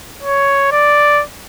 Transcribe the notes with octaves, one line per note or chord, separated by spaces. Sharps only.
C#5
D5